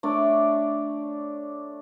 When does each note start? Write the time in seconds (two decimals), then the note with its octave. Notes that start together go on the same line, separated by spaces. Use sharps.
0.03 A3 D4 C#5 D5